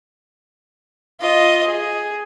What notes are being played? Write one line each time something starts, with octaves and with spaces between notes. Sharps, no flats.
F4 D#5
G#4